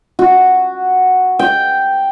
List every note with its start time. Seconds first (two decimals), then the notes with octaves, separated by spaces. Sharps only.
0.19 F#4
1.39 G5